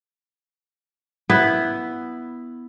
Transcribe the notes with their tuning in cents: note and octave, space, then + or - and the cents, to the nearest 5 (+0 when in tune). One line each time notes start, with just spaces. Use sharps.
B3 +0 E4 +5